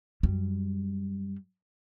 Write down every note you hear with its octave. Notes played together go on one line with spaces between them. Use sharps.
F#2 G3